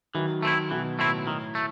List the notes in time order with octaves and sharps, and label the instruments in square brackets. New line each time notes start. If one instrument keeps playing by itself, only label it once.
[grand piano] D#3 F#3 [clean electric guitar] E3
[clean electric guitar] A3 C4 E4
[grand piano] B2 D#3 [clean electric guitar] E3
[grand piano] A2 [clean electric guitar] A3 C4 E4
[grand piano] A2 [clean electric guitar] D#3
[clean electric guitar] A3